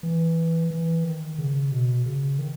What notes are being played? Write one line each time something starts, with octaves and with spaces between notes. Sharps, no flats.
E3
E3
D#3
C#3
B2
C#3
D#3